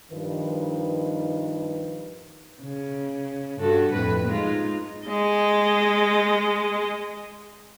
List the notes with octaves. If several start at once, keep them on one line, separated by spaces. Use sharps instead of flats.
G2 D#3 F3 D#4 B4
C#3
G2 F#4 A4
F2 A2 B4
G#3 D#4 F4
G#3 D#5